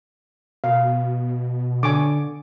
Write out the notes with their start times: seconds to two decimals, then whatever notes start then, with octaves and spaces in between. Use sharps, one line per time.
0.64 B2 F5
1.83 D3 G#5 C#6 D6